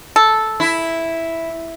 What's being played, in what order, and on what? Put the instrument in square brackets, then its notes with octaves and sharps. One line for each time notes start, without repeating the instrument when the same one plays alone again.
[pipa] A4
[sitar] E4